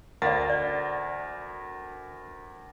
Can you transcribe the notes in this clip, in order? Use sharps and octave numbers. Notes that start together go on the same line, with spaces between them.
D2 A#4 D5 F5 F#5 A6
D5